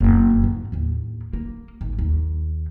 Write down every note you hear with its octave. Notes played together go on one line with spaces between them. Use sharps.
F#1 B3
F2 G#2
D#2 A2
A#3
G#1
D#2